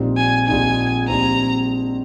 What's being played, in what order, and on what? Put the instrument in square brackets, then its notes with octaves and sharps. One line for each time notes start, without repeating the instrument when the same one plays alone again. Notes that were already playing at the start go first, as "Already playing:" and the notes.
Already playing: [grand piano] A#1 A#2 G3 C4 D#4
[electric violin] G#5
[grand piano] A#1 A#2 G3 C4 D#4 [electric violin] G#5
[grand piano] A#1 A#2 G3 C4 D#4 [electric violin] A#5